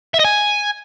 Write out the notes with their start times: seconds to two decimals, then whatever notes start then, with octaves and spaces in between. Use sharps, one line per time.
0.14 E5
0.19 D#5
0.24 G#5